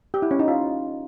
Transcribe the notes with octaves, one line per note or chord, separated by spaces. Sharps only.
G4
E4
C#4
D#4
F4